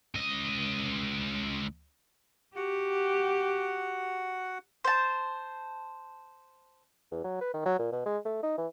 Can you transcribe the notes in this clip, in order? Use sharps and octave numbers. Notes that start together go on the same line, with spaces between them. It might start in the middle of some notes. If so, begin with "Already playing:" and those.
C#2 D#5
F#4 G4 F#5
C5 A5
E2
F#3
B4
D#3
F#3
A#2
B2
G#3
A3
D#4
E3